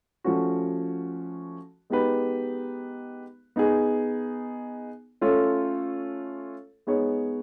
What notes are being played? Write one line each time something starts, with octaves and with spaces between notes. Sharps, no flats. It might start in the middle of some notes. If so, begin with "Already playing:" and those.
F3 A3 C#4 F#4
G#3 B3 D#4 G4 B4
B3 D#4 G#4
A3 C#4 F4 A4 C#5
G#3 B3 D#4 G#4 C#5